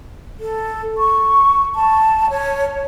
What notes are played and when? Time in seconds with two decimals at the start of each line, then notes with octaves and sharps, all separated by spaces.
0.40 A4
0.98 C#6
1.75 A5
2.30 C#5